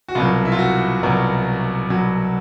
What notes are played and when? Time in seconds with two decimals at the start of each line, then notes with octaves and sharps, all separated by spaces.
0.08 F#4
0.15 C2 B2 F#3 F4
0.45 E4
0.52 F4
0.59 F#4
1.03 C2 B2 F#3 A#4
1.90 C2 B2 F#3